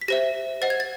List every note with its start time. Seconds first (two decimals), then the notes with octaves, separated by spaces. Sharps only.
0.01 B6
0.08 G4 C5 E5 A#6
0.62 C5 D#5 F#5 A6
0.70 G#6
0.80 A6